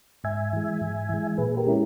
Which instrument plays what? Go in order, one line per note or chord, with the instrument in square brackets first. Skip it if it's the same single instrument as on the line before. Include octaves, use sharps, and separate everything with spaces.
[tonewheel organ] G#2 E5 G#5
E3 G#3
G#2
E3 G#3
A#2 G#4 B4
G4 A#4
G#3 C#4 E4